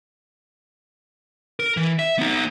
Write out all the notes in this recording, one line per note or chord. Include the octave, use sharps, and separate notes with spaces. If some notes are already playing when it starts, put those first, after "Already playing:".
A#4
E3
E5
B3 D#4